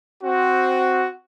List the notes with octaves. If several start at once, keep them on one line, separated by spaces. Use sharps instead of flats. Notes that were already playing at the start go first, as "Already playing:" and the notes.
C4 F#4